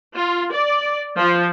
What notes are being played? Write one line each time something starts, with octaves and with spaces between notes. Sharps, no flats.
F4
D5
F3